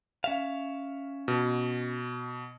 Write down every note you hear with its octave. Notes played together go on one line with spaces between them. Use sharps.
C#4 E5 F5
B2